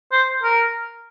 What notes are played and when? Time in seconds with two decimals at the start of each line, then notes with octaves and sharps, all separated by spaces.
0.12 C5
0.43 A#4